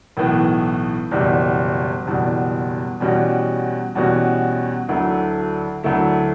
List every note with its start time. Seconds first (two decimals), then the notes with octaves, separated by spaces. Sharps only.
0.17 B1 A2 E3 B3
1.11 F#1 E2 B2 G3
2.05 F#1 E2 B2 G3
3.00 E2 B2 G3 C#4 F#4
3.95 E2 B2 G3 C#4 F#4
4.89 D2 D3 F#3 A3 E4
5.84 D2 D3 F#3 A3 E4